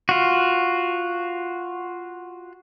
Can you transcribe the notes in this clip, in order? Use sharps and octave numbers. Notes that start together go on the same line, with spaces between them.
F4 F#4